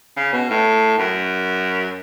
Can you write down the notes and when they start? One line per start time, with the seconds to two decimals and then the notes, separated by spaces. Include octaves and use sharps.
0.16 C#3
0.32 B2
0.49 A2
0.98 F#2